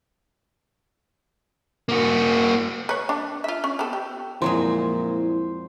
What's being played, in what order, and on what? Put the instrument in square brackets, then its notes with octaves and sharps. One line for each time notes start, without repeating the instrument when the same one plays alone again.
[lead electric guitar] A#3 F#4
[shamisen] B4 C#5
D4
F4 E5
C#4
B3 C4 A4
G4
[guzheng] F2 F#3 G#3 [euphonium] A#2 [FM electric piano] E4 [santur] C5